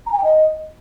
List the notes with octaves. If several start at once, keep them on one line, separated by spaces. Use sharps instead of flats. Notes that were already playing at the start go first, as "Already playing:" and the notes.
A#5
G#5
G5
D#5